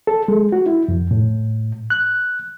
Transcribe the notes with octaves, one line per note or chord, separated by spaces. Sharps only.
A4
G#3
F#4
E4
F2
A2
F#6